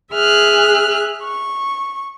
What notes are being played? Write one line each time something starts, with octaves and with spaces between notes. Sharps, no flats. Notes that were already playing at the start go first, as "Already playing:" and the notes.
G#4 E5 F6 F#6
C#6